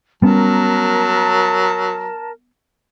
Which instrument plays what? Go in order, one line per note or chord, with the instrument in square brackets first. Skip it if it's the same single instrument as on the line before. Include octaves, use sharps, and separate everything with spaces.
[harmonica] F#3 [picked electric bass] G3 B3 C#4 [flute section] A#4 A5